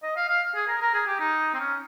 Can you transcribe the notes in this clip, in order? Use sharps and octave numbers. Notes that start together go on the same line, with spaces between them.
D#5
F5
F5
G#4
A#4
A#4
G#4
G4
D#4
C4
C#4